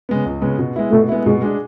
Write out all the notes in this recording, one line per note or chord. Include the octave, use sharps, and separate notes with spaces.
C#3 G#3 B3
C#2
C#3 G#3 B3
B2
G#3 B3 E4
B2 A3
G#3 B3 E4
B2 G#3
G#3 D4 G#4